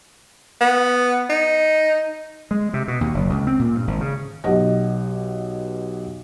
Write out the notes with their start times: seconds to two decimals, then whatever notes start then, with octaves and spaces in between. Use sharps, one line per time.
0.61 B3
1.30 D#4
2.51 G#3
2.74 C3
2.88 B2
3.01 D#2
3.14 F#1
3.30 C#2
3.47 C4
3.59 A#2
3.75 G2
3.87 G#1
4.01 C#3
4.44 B1 B2 G4 D#5 F#5 A#6